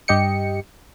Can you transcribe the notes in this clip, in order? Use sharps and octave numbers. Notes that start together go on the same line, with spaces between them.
G2 G4 D#5 G5 C#7